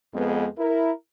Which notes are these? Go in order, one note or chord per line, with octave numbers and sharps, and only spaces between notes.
F2 G#3 B3
E4 A#4